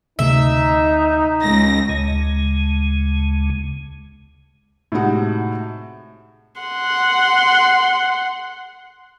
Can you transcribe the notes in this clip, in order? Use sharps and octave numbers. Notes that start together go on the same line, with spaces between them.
D2 C3 A3 D#4 E5
C#2 A#6
D2 C#3 G#3
A2 C3 G#3 D#4 F#4
F#5 C6